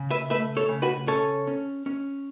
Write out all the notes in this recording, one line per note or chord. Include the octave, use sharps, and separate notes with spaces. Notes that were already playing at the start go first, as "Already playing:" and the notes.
Already playing: C#3
B4 E5
A3 B4 E5
A4 C#5
C#3
F#4 B4
C#4 A4 C#5
C#4
C#4